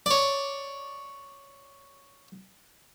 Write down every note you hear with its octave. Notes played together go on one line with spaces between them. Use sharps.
C#5 D5